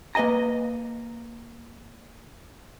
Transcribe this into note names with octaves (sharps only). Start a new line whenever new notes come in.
A#3 B4 D#5 G#5 A#5